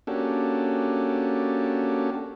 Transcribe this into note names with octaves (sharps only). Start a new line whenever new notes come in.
A#3 C#4 D4 F#4 G4 A4